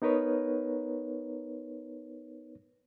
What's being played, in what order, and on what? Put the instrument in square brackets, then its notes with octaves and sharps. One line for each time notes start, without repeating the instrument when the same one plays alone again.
[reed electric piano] B3 D#4 A#4 B4 C#5